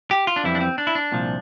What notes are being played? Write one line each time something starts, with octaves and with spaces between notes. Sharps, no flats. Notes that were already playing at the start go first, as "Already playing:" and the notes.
G4
F4
D4
F2 E3 G3 E4
D4
C4
D4
E4
D4
C2 A#2 F3